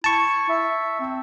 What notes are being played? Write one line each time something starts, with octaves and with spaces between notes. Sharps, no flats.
E4 A5 C#6
E5
C4